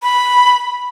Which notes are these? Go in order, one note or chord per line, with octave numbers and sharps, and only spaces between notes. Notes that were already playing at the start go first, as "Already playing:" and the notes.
B5